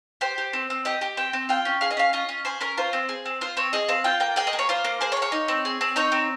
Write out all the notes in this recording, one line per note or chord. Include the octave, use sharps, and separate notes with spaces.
G4 C5
G4
C4
C4
G4 D#5
G4
C4 G5
C4
F4 G5
C#4
G#4 F5
D#5
C#4 F5
F4 D#5
C#4
G#4 C5
C#4 A#4
F4 C5
C4
G#4
C4
F4 C5
C4 C#5
G#4 D#5
C4 F5
F4 G5
A#3 G5
G#4 G5
D#5
A#3
C#5
F4 C5
A#3
G#4 C5
C#5
A#3
C#5
D#4
C4
G#4
C4
D#4 C#5
C4